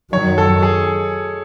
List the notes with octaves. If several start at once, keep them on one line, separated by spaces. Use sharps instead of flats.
F#2 D#3 F#3 C#5
A4
G#4